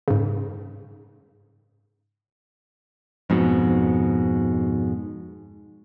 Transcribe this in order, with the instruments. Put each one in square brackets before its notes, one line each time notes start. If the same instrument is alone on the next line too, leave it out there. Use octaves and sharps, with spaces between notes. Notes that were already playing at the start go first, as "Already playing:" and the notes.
[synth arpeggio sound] G#2 C#3
[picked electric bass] F2 G#2 B2